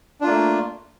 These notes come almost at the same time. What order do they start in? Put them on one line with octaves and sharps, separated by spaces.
D4 F4 A#3 A3